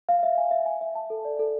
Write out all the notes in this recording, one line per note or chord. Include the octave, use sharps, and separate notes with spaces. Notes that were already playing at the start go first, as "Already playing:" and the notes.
F5
E5
G#5
E5
G#5
E5
A5
A4
D5
A4